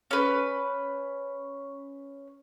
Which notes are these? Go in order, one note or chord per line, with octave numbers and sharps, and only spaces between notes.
C#4 B4